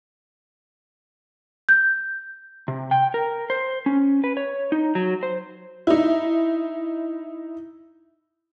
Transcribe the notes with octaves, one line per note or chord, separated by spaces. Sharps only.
G6
C3
G5
A#4
C5
C#4
B4
C#5
D#4
F#3
C5
D#4 E4